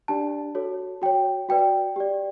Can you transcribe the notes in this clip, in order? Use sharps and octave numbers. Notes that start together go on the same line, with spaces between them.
D4 G4 D5 A5
F#4 A4 C#5
F#4 C#5 G5
F#4 B4 D5 G5
G4 D5